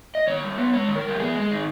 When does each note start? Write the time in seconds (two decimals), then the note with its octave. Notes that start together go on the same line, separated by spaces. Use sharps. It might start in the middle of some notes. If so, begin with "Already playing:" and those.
0.15 D#5
0.27 D#3 C#5
0.42 G2
0.58 B3
0.74 G#3 C#5
0.88 D#3
0.96 A#4
1.04 G2 G4
1.19 B3 G#4
1.34 G#3
1.41 G#4
1.50 D#3